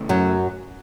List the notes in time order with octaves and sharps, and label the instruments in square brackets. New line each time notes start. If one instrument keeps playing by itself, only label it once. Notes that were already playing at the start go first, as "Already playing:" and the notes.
Already playing: [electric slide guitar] C#3 A3 C#4 E4 A4
[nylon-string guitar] F#2 F#3